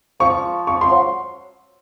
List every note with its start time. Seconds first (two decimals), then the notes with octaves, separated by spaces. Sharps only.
0.20 F3 C#6
0.67 C#6
0.81 C6
0.90 F#3